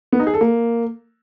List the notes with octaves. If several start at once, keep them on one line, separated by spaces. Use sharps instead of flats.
B3
D#4
G#4
A4
A#3